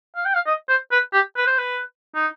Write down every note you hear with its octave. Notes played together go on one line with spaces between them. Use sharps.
F5
G5
F5
D#5
C5
B4
G4
B4
C5
B4
D#4